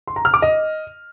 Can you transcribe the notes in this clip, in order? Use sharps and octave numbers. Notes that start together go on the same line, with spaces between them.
C6
A#5
F6
D6
D#5